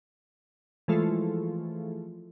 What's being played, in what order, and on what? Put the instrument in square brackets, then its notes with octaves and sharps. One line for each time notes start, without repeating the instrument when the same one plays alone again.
[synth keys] E3 F3 G#3 A3 F4